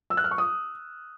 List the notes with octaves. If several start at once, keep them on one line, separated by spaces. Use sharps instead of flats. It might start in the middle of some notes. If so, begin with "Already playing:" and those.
E6
F#6
F6
C#6
D#6